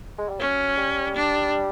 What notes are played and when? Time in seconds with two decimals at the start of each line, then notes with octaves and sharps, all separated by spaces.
0.18 G#3
0.29 G3
0.40 F#3 C#4
0.77 G3
1.16 D4